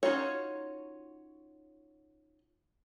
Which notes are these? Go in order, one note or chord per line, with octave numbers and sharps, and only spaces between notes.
C#4 D#4 F4 F#4 C#5